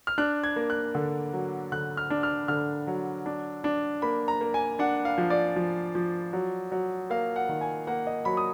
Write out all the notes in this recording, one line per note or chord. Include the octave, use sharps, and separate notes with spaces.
F6
D4 F#6
G#6
A#3
F#6
D3
F#3
D3 F#6
F6
D4
F6
D3 F6
F#3
D4
D4
A#3 B5
A#5
A#3
G#5
D4 F#5
F5
F3
D5
F3
F3
F#3
F#3
A#3 F5
F#5
D#3
G#5
A#3 F#5
D#5
F#3 B5
D#6